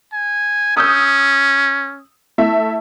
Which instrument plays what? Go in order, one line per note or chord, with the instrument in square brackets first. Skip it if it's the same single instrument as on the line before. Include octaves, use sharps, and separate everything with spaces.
[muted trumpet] G#5
[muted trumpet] C#4 [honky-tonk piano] D#6 E6 G6
[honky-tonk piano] A3 E4 E5